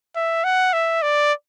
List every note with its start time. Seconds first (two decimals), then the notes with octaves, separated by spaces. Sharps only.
0.16 E5
0.44 F#5
0.73 E5
1.02 D5